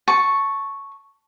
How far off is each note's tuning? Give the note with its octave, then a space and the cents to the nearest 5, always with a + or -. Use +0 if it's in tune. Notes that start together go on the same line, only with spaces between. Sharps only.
A5 +0 C#6 +0